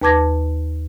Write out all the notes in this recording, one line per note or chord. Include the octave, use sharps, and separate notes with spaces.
D#2 B4 A5 D6 G#6 A#6